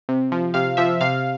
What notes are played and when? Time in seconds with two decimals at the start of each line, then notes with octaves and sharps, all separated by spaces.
0.09 C3
0.32 F3
0.54 C3 F5
0.77 F3 E5
1.01 C3 F5